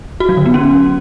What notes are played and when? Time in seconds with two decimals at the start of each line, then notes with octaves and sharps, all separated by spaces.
0.20 F#4
0.29 F#3
0.37 D3
0.46 B3
0.54 C#4